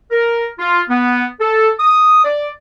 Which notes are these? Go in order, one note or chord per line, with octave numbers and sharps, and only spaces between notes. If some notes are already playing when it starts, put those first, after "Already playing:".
A#4
F4
B3
A4
D#6
D5